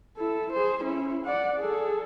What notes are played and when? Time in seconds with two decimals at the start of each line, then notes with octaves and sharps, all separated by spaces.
0.17 E4 A4
0.53 G#4 C5
0.84 C#4 E4
1.26 D5 F#5
1.59 G#4 A4